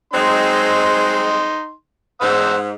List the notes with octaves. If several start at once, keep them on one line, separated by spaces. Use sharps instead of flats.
F#3 G#3 C4 D#4 C6
G#2 C5 F#5 E6